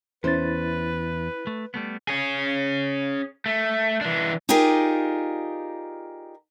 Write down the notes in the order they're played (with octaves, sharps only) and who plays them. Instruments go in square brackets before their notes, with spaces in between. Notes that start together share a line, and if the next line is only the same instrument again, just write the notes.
[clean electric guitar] E2 [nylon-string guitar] C#4 C5 [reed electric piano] E4 A6 [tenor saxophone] B4
[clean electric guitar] A3
G3 A3 B3
[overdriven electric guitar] C#4 G#4
A3
E3 D4
[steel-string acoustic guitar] D#4 F4 G4 G#4 A#4 D5